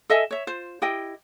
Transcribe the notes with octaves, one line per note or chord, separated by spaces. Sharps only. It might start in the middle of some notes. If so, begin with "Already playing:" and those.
A4 D#5 E5 G#5
C#5 E5
F4 C5
E4 G4 D#5 G5